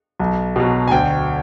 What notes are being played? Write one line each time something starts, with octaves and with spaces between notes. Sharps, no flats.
B1
B2 F#3
G#5
D2 G5